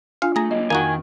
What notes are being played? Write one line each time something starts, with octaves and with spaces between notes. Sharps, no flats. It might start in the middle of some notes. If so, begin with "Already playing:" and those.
D4 F4 F5 G#5
A3 G#4 A#5
F#3 A#3 D#5
F2 D#3 A#3 D#4 F#4 G5 G#5